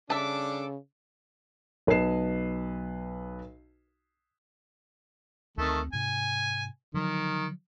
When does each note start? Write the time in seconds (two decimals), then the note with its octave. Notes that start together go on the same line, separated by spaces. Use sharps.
0.10 C#3 G3 D4 A4 E5 A5 D6
1.87 B1 B4 D#5 A5 C7 E7
5.58 D2 D#3 A3 C4
5.93 G#2 C3 G#5
6.94 D3 D#3 F3 F#3